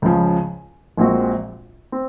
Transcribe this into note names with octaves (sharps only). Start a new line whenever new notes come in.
C#2 C#3 F3
A#1 A#2 G#3 C4 F#4
C4